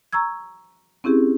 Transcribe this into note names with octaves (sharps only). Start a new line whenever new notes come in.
A#5 C#6 E6 G#6
C4 C#4 E4 G4 G#4